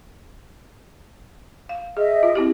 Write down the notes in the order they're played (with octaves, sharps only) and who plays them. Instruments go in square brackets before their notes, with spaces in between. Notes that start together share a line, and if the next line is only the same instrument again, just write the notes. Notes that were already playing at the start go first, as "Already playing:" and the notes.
[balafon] F5
[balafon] G#4 [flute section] D#5 E5
[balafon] F4
C4 E4 G4